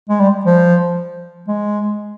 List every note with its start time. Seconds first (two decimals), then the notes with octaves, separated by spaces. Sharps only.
0.09 G#3
0.20 G3
0.45 F3
1.48 G#3